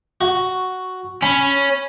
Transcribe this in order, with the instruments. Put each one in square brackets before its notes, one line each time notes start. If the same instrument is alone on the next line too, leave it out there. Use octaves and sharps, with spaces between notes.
[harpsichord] F#4
[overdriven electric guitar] C#4 [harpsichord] B5